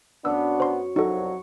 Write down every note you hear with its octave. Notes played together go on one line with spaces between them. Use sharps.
F#2 B3 D4 C#5 E6
C5 C6
C2 F2 F#3 D#4 A4 C#6